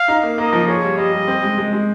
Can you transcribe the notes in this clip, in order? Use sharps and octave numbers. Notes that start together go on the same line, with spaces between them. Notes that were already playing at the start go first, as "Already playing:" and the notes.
Already playing: F5
D#4
A#3
A#3 D#5
F3
G#4 C#5
G3
G3 D#5
G3
C4
G#3
G#3
G#3